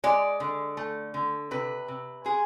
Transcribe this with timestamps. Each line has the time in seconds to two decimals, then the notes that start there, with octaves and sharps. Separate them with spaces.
0.04 G#3 D5
0.40 D3
0.77 A3
1.14 D3
1.51 C3 B4
1.88 C3
2.25 G#3 G#4